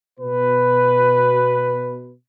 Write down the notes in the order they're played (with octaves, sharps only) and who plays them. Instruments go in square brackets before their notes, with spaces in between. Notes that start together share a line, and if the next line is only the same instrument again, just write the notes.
[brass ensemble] B2 B4